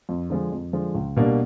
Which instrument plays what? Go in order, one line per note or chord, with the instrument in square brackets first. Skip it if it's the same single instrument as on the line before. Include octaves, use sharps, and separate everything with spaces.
[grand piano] F2
D3 F3 G#3
F2
D3 F3 G#3
C#2
B2 G3 A#3 D4